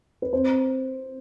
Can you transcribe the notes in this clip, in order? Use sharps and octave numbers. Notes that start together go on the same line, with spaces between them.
B4
C4 C5